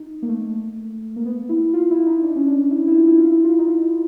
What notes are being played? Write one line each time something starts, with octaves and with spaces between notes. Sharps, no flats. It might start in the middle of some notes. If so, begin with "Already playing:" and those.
Already playing: D#4
A#3
A3
A#3
B3
E4
F4
E4
D#4
D4
C#4
D4
E4
E4
F4
E4
F4
E4
F4
D#4
E4